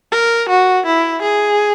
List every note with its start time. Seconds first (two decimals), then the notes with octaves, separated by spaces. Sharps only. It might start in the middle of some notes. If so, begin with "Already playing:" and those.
0.12 A#4
0.49 F#4
0.86 E4
1.22 G#4